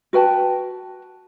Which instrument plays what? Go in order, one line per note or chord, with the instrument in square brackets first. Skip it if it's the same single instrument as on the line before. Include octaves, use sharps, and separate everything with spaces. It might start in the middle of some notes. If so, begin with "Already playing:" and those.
[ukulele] F#4 B4 G5 A5